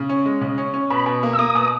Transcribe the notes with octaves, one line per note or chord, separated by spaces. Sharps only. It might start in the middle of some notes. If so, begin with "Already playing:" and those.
Already playing: C#3
C#4
G#3
C#3
C#4
C#4
B2 B5
B2
A#3
E6
A#3 D#6
B2